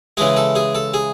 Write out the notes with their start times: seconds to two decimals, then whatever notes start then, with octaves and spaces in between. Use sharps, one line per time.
0.17 C#3 E3 G#3 G#4
0.37 A4
0.55 G#4
0.75 A4
0.94 G#4